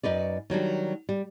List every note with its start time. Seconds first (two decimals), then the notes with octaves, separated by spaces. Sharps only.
0.03 F#2 D#4 B4 D5
0.50 D#3 F#3 G3 D4
1.09 G3